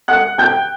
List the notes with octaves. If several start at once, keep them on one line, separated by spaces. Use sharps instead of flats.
F#5 F#6
G5 G6